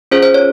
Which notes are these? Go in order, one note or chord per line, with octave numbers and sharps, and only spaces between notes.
C#4 F4 G#4 C5
C5
C#5